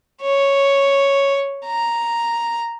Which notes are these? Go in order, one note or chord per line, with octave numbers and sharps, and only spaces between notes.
C#5
A#5